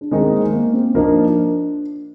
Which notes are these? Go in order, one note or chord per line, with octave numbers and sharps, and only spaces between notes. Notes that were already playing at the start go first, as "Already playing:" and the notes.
D4
D#3 G#3 C4 D#4
A#3
A#3
C4
F3 A#3 D4 D#4